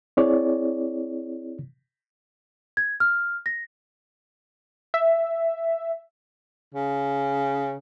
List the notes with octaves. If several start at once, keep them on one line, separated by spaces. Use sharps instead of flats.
C4 E4 G#4 C#5 D5
G#6
F6
A#6
E5
C#3